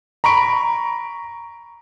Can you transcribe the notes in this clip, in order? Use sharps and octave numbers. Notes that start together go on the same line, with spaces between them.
A#5 B5 C#6 D7